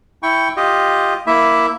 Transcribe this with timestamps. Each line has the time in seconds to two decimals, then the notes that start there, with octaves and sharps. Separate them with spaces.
0.23 E4 G5 C#6
0.56 F4 G4 D#5
1.27 A#3 E4 E5